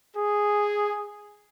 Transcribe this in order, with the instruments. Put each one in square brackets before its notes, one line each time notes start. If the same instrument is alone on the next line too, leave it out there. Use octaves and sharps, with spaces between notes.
[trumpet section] G#4